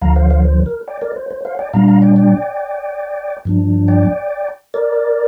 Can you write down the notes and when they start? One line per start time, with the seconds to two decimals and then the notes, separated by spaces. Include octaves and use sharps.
0.01 D2 D3 F3 F5 A#5
0.16 C5 F5
0.30 C5 F5
0.45 C5
0.66 A#4
0.88 D5 G5
1.01 A#4 D5
1.16 C5
1.31 C5
1.45 C5 F5
1.59 D5 G5
1.73 A#2 G3 D4 F5 A#5
1.88 F5 A#5
2.02 D5 G5
2.16 D5 G5
3.45 G2 F3 D4
3.88 D5 G5
4.74 A#4 D5